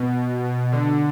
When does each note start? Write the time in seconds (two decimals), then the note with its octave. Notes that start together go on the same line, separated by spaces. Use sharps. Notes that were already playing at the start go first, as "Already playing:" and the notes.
Already playing: B2
0.43 B2
0.72 D3